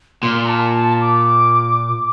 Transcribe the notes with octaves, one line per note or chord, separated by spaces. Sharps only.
A#2 C6
A#5
A5
A5
D6